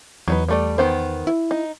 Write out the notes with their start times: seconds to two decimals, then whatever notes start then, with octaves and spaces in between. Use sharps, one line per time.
0.28 E2 F#3 D#4 B4
0.49 G3 A3 D5
0.78 D#3 B3 C5
1.27 E4
1.51 D#4